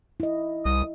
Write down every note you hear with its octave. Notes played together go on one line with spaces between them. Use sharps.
E4 D#5
C2 D#6